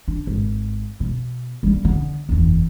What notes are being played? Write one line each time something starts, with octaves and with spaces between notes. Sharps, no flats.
D4
G#1
B2
G3 A#3
D3 B3
F#1 E2